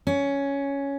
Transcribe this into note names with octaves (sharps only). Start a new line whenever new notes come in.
C#4